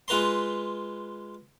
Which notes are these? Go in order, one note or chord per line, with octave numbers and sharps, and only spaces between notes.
G#3 F4 B4 A#5 C6